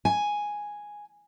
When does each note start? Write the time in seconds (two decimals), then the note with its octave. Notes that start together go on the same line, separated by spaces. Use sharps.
0.05 G#5